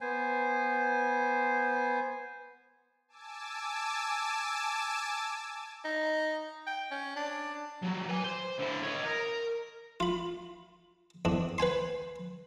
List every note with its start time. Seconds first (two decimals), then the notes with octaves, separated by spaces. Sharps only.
0.01 B3 C5 G#5
3.08 G#5 A5 D6 E6
5.84 D#4
6.67 G5
6.91 C#4
7.16 D4
7.82 F#3 G3
8.09 B4 G#5
8.24 C5
8.59 D3 E4
8.83 C#5 D#5
9.05 A#4
10.00 F4 B5
11.25 E2 D4
11.58 B4 G5 G#5 C6